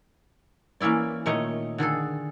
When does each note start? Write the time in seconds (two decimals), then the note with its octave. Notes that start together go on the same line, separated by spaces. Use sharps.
0.80 E3 A#3 C#4 E4 D5
1.26 A#2 D#3 A3 D#4 C#5 D#5
1.78 D3 D#3 G#4 A4